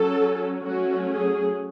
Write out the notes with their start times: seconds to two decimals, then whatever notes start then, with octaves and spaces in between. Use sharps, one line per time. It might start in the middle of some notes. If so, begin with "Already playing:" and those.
Already playing: F#3 C#4 A4
0.66 F#3 A3 C#4 F#4
1.10 G#4